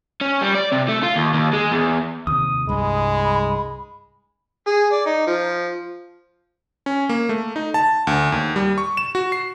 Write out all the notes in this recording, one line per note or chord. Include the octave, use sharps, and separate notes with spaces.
C#4
G3
D5
C3
A3
F4
D#2
D#2
G#3
E2
D#2 C3 D#6
C2 G2 G#3 B5
G#4
D5
D#4
F3
C#4
A#3
A3
D#4
A5
D2
D#2
G3
C#6
E7
F#4
C7